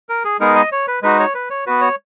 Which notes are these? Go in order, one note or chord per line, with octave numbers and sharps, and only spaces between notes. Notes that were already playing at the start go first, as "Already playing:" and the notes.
A#4
G#4
G#3 B3 D#4 G#4 A#4
D#5
C#5
B4
G#3 D#4 F#4 B4
C#5
B4
C#5
B3 F#4 B4
C#5